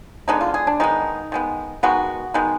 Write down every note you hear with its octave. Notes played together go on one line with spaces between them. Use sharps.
D3 G#3 B3 D#4
F4
G#4
D4
D#3 G#3 B3 D#4
D#3 G#3 B3
D#3 G#3 B3 F#4
D#3 G#3 B3